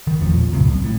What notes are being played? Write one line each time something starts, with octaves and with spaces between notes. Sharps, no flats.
D#3
A1 E2 F3 C#4
A#2
C#2 G2 C#3 C4
C2 F#2
A2